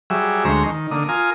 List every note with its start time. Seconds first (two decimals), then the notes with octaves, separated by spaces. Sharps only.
0.10 F#3 G3 G#4 E5
0.45 D2 G#3 C5 A#5 C#6
0.66 D#3
0.91 D3 A#3 D#6
1.09 F4 A#4 G#5 D#6